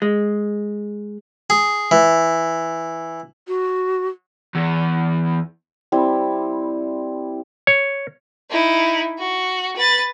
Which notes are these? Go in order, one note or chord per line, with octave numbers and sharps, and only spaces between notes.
G#3
G#4
E3
F#4
E2
G3 C4 E4
C#5
D#4 E4
F#4
B4 A6